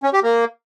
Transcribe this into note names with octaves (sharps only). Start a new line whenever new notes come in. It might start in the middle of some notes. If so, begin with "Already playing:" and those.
C#4
G4
A#3